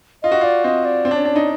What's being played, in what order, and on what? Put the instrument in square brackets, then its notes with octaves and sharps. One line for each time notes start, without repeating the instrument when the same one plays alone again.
[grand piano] F4 [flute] D#5
[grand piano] F#4
F4
[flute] D5
[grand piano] C4 [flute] D#5
[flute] D5
[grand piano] C4
D4
C#4
D4
D#4